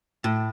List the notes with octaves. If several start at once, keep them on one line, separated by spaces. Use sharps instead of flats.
A2